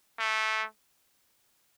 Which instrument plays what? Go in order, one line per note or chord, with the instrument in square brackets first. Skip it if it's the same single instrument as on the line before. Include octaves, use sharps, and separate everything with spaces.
[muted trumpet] A3